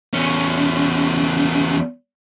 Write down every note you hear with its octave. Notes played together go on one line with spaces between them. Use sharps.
E2 C#4